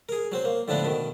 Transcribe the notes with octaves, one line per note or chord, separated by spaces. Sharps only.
G#4 A#4
F#3 C4 C5
A#3
A2 D3 F3 B3 D4 E4
B2 D#3